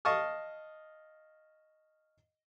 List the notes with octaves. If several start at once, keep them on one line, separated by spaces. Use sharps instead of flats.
D#5 F5 A5 C#6 D#6 F6